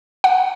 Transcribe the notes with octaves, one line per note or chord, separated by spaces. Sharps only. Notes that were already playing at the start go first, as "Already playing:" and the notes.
F#5